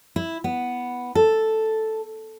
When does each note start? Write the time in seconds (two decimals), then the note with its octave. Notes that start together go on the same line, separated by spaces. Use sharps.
0.16 E4
0.44 B3
1.15 A4